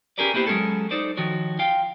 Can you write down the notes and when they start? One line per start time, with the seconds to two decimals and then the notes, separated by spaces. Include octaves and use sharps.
0.18 C#4 G4 G#4 A#4 B4 D5
0.34 A#3 B3 E4 G4 C5
0.47 F#3 G#3 A#3 C#4 G#4 A4
0.91 D#4 A4 C5 D5
1.17 D#3 F3 F#4 C#5
1.59 F4 F5 G5